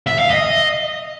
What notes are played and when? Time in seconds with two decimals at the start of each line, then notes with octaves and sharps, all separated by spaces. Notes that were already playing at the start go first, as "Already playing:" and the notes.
0.07 E5
0.18 F5
0.30 D#5